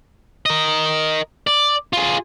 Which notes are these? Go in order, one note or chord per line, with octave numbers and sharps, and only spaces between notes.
A#4 D#5
D5
F4 G#4